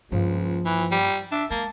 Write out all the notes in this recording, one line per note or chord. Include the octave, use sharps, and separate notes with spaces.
C#2 G2 F3 A#3
E3
G3
D4 E5
G#3 A#3 A5